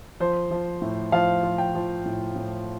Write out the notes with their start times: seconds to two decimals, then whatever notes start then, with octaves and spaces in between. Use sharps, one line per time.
0.20 F3 C5
0.51 F3
0.82 A2
1.12 F3 F5
1.43 F3
1.58 G5
1.75 F3
2.06 A2
2.36 A2